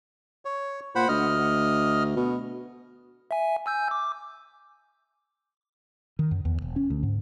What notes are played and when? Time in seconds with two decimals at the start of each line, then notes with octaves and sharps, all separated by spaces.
0.45 C#5
0.95 A#2 C5 F#5 B5
1.08 D2 D#5 F6
2.16 B2
3.31 E5 G#5
3.66 G#5 E6 G6
3.91 D6
6.19 D#3
6.31 F#2
6.45 E2
6.62 E1
6.76 C#4
6.90 D2
7.03 G#2